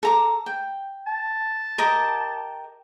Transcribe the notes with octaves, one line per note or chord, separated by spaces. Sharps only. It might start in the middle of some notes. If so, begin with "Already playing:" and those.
A4 A#5 D6
G5
A5
G4 A#4 D#5